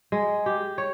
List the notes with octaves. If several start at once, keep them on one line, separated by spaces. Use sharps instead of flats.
G#3
G4
C#5